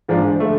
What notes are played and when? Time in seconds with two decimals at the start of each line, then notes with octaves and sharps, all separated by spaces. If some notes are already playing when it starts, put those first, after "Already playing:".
0.09 G#2 F3 G#3 D4
0.40 D3 A3